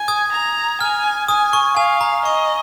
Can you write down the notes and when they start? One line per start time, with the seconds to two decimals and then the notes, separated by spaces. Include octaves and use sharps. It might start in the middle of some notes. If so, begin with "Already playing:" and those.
Already playing: G#5
0.08 D#6 G#6
0.32 A#5
0.81 G#5 F6
1.28 G#5 D#6
1.53 C#6
1.77 F5 G#5
2.01 A#5
2.25 D#5 C#6